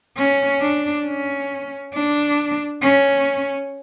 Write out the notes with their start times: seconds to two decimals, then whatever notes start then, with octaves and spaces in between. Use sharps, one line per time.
0.17 C#4
0.61 D4
1.06 C#4
1.94 D4
2.82 C#4